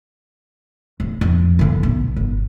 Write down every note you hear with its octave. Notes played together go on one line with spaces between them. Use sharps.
D1
F2
D3 E3
B1
G1